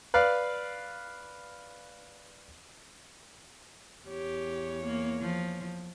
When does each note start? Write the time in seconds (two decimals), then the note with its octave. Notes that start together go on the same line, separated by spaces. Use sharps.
0.14 B4 D5 F5
4.07 E2 G4 C#5
4.86 A#3
5.21 F3